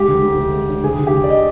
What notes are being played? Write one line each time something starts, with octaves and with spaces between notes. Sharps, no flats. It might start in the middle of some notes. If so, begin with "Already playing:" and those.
Already playing: G#3 G4
D2
D2
D2
G#3
D3
D2 G#4
D2
G4
D2
D5
D#5